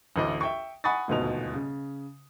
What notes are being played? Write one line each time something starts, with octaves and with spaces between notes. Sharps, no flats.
A1 D2 D#5 D6
E5 G5 C#6
F#5 G#5 B5 C#6 D#6 A6
D#1 D2 G#2 B2 F7
C#3